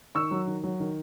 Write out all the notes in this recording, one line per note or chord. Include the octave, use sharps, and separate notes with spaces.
D#3 C#6 E6
F#3
D#3
F#3
D#3